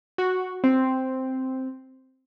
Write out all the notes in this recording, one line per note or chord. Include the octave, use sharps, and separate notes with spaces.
F#4
C4